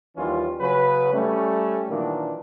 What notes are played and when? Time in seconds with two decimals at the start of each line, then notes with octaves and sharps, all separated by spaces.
0.17 D#2 E3 G3 C#4 F4
0.60 C#3 F#3 B4
1.13 G3 A3 C#4
1.89 A#2 D#3 E3 F#3 A#3 D4